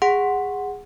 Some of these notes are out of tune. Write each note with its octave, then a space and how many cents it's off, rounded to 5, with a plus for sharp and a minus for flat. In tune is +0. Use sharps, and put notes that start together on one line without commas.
G#4 -20 F#5 +0 C6 +0